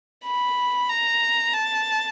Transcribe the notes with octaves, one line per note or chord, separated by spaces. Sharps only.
B5
A#5
A5